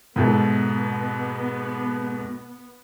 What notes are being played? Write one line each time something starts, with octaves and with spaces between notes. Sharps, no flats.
G#2 B2 A3 B3